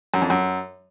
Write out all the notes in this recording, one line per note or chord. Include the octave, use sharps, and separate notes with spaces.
F#2
F2
F#2